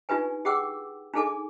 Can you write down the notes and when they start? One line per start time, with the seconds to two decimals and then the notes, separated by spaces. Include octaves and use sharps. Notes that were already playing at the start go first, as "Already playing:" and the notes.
0.09 D4 D#4 F4 G4 B4 G#5
0.45 G4 G#4 F#5 G5 D6 E6
1.14 D4 D#4 G#4 A4 G#5 D6